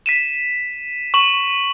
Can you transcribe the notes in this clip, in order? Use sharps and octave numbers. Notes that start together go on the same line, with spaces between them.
B6 D#7 E7
C#6 E7 F#7